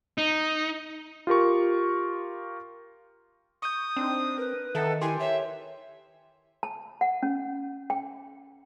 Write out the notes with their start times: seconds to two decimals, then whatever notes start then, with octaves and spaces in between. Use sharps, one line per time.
0.18 D#4
1.27 F4 G4 A#4 C#6
3.62 C#6 D#6 G6
3.96 C4 D4 D#4
4.38 A#4 B4
4.75 D#3 A4 E5 F#5
5.02 E4 G4 G5 G#5 C6
5.20 C#5 E5
6.63 A5
7.01 F#5
7.23 C#4
7.90 G5